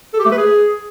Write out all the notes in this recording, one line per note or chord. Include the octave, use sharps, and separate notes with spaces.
A4
G4
A3
B4
G#4